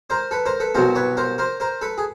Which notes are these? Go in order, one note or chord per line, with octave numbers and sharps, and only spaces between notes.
A#4 C5
A4 B4
A#4 C5
A4 B4
C2 B2 F#3 A#4 C5
B4 C#5
A#4 C5
A#4 C5
A#4 C5
A4 B4
G#4